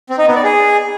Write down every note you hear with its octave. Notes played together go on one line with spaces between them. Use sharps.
C4
D#4
B3
D5
G#4